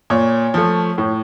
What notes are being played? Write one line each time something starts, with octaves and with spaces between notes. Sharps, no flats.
A#2 C#5
F3 A3
A2